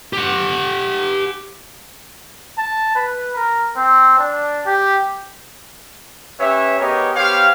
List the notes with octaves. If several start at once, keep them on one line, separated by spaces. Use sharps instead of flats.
G4 F#5
A5
B4
A#4
C4
D4
G4
C#4 G4 B4 C#5 E5
B3 G4 G#4 A#4 C#5 D#5
B3 G4 C5 C#5 F5